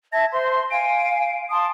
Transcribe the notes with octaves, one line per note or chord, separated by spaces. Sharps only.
E5 A5 G#6 A#6
C5 C6
F5 G#5 D7
A5 C6 D#6